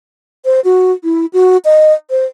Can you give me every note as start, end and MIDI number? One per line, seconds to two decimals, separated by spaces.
0.45 0.60 72
0.64 0.92 66
1.04 1.26 64
1.33 1.57 66
1.65 1.93 75
2.10 2.25 72